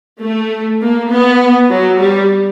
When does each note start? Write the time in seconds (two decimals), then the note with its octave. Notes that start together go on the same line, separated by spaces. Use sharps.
0.21 A3
0.81 A#3
1.11 B3
1.70 F#3
2.00 G3